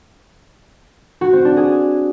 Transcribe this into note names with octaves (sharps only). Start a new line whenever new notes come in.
F#4
C4
D4
G#4